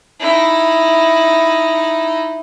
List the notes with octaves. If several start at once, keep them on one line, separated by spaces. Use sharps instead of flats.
D#4 E4